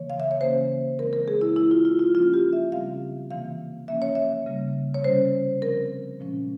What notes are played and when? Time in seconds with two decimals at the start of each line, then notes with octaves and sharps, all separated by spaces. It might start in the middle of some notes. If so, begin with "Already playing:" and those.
Already playing: C#3 E3 A#3 C#5
0.10 F5
0.20 E5
0.31 C#5
0.40 C#3 E3 A#3 C#4 C5
0.99 E3 G#3 C4 A#4
1.13 A#4
1.28 G#4
1.41 E4
1.56 E3 G#3 C4 E4
1.71 F4
1.85 F4
1.99 F4
2.14 F3 A#3 C#4 F4
2.34 G4
2.53 E5
2.72 C#3 G3 C4 F5
3.31 C3 E3 A#3 F5
3.88 F3 A#3 C#4 E5
4.02 C#5
4.15 E5
4.47 C#3 G3 A#3
4.94 C#5
5.04 C3 G3 C#4 C5
5.62 F3 C4 A#4
6.20 A#2 F3 G#3 C#4